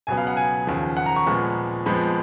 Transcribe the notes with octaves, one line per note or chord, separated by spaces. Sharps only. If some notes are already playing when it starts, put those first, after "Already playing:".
C#2 B2 F#3 B3 G#5
F5
F#5
G#5
D#2 C#3 F3
F#5
A#5
C#6
A#2 F3 G#3 B3
F2 F3 G#3 B3 B5